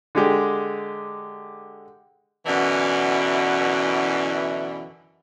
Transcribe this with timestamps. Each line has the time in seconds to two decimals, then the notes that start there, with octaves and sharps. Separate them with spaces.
0.15 D3 G#3 G4
2.46 F#2 B2 D3 E3